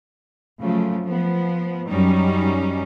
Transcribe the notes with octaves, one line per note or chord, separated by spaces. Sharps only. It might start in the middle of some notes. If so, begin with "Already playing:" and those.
C#3 F3 F#3 A3
F3 B3
F#2 F#3 G3 C#4 D#4